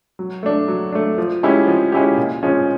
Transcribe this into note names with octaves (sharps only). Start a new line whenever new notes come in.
F#3
A3 D4
F#3
A3 D4
F3
G#3 C#4 E4 G4
F3
G#3 C#4 E4 G4
A#2
F3 G#3 C#4